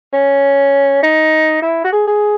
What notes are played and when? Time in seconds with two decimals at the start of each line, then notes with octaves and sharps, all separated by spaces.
0.13 C#4
1.03 D#4
1.62 E4
1.84 F#4
1.92 G#4
2.07 G#4